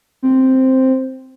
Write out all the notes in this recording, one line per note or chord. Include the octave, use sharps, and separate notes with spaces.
C4